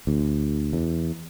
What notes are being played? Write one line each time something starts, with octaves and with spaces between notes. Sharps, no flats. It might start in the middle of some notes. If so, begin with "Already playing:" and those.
D2
E2